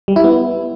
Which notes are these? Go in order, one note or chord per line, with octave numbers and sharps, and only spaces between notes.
G3
E4
B3